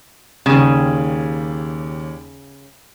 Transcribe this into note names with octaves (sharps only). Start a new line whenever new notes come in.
D#2 C#3 G3